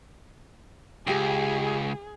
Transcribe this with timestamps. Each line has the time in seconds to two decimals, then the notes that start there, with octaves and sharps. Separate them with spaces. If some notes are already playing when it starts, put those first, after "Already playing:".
1.07 C#2 G4 G#4 G5